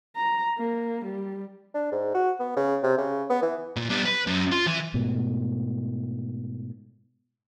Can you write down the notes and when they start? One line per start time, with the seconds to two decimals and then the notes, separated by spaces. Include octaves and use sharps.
0.16 A#5
0.59 A#3
1.05 G3
1.74 D4
1.92 G#2
2.14 F#4
2.40 B3
2.57 C#3
2.83 C3
2.98 C#3
3.30 B3
3.42 E3
3.77 A#2
3.90 G3 B3
4.06 B4
4.27 F#2
4.52 F4
4.67 E3
4.94 G#2 B2 A3